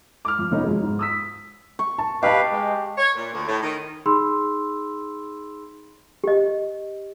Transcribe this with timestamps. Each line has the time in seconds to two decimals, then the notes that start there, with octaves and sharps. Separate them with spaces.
0.25 D6 F6
0.39 F2
0.51 F1 B3 C#4 D#4
0.63 F2 F#3 G#3
0.82 G#2
0.99 D#6 E6 B6
1.79 C#6
1.98 A5
2.23 G4 B4 D#5 F5 A5
2.52 G#3
2.98 C#5
3.15 A#2
3.33 D2
3.47 A2
3.63 D#3
4.06 D#4 G#4 B5 C6 E6
6.24 G4 D#5